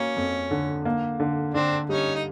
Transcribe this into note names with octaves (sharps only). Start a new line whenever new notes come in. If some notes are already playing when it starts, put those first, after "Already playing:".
Already playing: F#3 A#3 C#4
F2
D3
A#3
D3
D3 C4 D4
G3 C#4 D#4
D#4